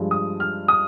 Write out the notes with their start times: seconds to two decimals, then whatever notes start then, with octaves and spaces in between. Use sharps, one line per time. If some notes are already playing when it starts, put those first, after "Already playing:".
Already playing: G2 F3 G#3
0.11 D#6
0.40 F6
0.68 D#6